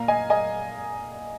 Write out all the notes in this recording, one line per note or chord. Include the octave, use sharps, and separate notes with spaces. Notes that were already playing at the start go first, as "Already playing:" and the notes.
Already playing: A#2 A#3 F5 A#5
D#5 G#5
D#5 G#5